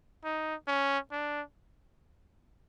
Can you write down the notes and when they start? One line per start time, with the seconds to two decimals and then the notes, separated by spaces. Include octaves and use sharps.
0.24 D#4
0.67 C#4
1.11 D4